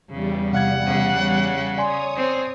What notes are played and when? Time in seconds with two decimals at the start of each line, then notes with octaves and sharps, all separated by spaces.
0.10 E2 C#3 G3
0.52 C3 F5 F#5 G#6
0.86 C#3
1.21 C#5
1.78 C#5 D5 G#5 C6 D#6
2.16 C4